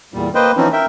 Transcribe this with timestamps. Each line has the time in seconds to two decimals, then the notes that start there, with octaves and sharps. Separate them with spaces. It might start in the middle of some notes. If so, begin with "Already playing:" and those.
0.14 E2 A#2 G3
0.35 A#3 B4 C5 D#5 G5
0.57 E3 F3 C4 C#4 D#4
0.73 A#4 E5 G5